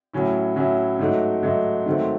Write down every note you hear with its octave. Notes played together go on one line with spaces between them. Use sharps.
A2 F#3 C#4 E4
A2 F#3 C#4 E4
G#2 F#3 A3 D#4
G#2 F#3 A3 D#4
G#2 D#3 F#3 A3 C4